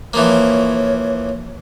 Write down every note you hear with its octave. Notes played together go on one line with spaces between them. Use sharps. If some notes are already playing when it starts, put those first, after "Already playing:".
E3 F3 A#3 C#5